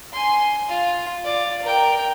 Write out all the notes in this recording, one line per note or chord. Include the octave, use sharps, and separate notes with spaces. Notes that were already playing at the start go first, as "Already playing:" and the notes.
G#5 C6
F4
F4 D5
A#4 G5